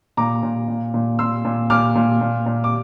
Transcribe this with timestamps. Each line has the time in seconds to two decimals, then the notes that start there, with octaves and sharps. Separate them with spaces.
0.17 A#2 A#5 D6
0.43 A#2
0.68 A#2
0.94 A#2
1.19 A#2 C6 E6
1.45 A#2
1.70 A#2 D6 F6
1.95 A#2
2.21 A#2
2.46 A#2
2.64 D6